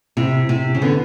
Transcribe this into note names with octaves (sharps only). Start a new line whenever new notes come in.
C3 E4
C3 E4
C#3
D3 B3